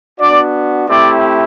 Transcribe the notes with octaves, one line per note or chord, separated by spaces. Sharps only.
B3 D4 F#4 D5
A3 C4 E4 G4 D5